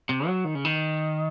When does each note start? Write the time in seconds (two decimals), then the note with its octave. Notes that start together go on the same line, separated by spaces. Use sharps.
0.09 C3
0.27 F#3
0.45 D#3
0.55 C#3
0.65 D#3